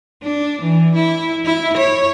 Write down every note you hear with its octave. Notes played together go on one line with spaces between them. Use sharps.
D4
E3
E4
E4
C#5